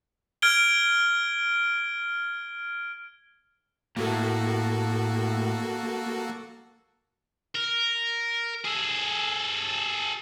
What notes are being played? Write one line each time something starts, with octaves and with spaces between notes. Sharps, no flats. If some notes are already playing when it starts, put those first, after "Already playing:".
F6 G#6 D7 G7
A2 A#3 F#4 A4
A#4
G#4 A4